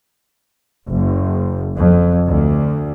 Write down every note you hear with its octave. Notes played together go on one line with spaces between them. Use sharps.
F#1
F2
D2